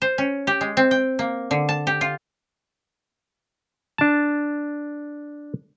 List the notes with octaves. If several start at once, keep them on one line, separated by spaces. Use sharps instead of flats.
C5
C#4
G4
G#3
C4
G5
A#3
D3
A5
G4
F4
D4 A5